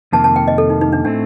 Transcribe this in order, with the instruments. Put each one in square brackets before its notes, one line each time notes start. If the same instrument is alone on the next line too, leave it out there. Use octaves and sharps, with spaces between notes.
[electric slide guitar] F2 C3 D#3 A#3 [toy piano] A5
[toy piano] A5
G5
D#5
A4
D#4
D#4
D4
[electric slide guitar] A2 A3 C4 [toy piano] D4